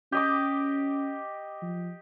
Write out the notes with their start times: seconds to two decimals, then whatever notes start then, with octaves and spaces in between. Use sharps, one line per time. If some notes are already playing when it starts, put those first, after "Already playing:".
0.12 C#4 G4 D#5 D6
1.62 F3